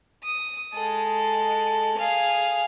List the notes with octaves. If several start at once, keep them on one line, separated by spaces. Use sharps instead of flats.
D#6
G#3 A4
G#4 F5